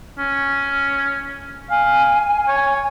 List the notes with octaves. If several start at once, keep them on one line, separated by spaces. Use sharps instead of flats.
C#4
F5 G#5
C#5